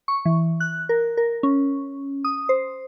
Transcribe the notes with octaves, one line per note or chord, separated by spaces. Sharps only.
C#6
E3
F#6
A#4
A#4
C#4
D#6
C5